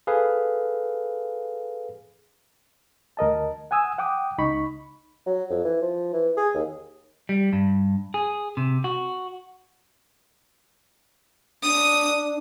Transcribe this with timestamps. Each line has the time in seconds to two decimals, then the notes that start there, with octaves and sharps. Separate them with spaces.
0.07 G#4 A4 B4 F5
3.17 D2 A#4 D#5 A5
3.71 F#5 G#5 D#6 E6
3.98 F#5 G5 D6 D#6
4.38 C#2 D#4 B5 C#6
5.26 F#3
5.50 F2
5.64 E3
5.82 F3
6.13 E3
6.37 G#4
6.54 D#2
7.29 G3
7.53 G2
8.14 G#4
8.57 C3
8.84 F#4
11.63 D4 D#6